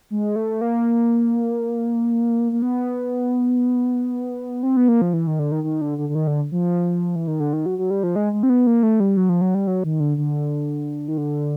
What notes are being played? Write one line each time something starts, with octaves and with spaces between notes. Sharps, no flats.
G#3
A3
A#3
A#3
B3
C4
B3
A#3
F3
E3
D#3
D3
D#3
D#3
D3
D3
D3
D#3
D3
F3
E3
D#3
D3
D#3
F#3
F#3
G3
F3
G#3
G#3
C4
B3
A#3
A3
G3
F#3
F3
F#3
G3
F#3
D#3
D3
D3
D#3
D3